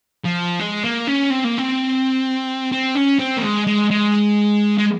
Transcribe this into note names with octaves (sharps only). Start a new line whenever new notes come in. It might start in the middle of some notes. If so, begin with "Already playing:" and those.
F3
G#3
A#3
C#4
C4
A#3
C4
C4
C#4
C4
A#3
G#3
G#3
G#3
G#3